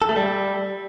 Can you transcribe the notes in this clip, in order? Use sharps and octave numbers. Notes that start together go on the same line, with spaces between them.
A4
A3
G3